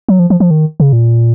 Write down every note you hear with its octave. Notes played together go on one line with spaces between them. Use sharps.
F#3
F3
F3
F3
D#3
C#3
A#2